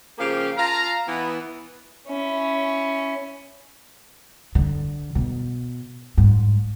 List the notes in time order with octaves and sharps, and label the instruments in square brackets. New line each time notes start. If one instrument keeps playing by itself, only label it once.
[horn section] C#3 F3 A#3 G4 F5
F4 F5 A5 A#5
E3 B3
[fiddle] C#4 E4
[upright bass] D3
B2
G#2